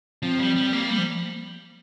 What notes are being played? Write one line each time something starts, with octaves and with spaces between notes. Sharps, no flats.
F3 C4
G3
G3
A#3
G3 A#3
F3